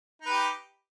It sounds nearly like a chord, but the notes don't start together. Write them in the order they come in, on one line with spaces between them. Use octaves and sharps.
D#4 B4 G4